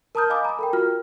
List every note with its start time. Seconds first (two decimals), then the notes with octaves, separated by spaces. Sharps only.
0.15 A#4 A5 A#5 D#6 F6 G6
0.30 D#5 F5 G#5 B5 D6 D#6
0.45 A#5 B5
0.59 A4 A#4 G5
0.73 F4 F#4 A#4 F6